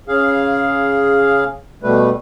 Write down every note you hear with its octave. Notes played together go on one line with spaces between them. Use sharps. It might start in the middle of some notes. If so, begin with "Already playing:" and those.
C#3 G#4 F5
B2 G3 A3 B4